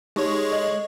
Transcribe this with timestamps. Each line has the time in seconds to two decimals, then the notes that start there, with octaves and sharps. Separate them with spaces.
0.16 G#3 D#4 G4 C#5 C#6
0.51 A4 D#5 F#7